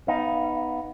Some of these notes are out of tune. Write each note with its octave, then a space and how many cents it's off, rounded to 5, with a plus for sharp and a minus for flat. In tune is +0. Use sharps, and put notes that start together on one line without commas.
B3 +0 D#4 +5 F5 -20